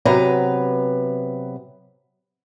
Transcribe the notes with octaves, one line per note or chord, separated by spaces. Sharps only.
C3 F#3 B3 B4 A#5